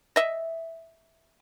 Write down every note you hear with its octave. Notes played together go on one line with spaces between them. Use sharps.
D#5 E5